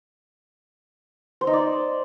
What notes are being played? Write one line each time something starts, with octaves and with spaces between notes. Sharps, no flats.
C5
D#4
D5